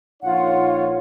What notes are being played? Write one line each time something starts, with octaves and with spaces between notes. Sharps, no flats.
A#1 D#4 F4 C#5 F#5